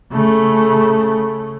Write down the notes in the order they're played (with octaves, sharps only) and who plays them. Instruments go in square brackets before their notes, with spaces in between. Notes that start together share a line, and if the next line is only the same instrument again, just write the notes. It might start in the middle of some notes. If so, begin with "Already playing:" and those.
[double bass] C#3 A3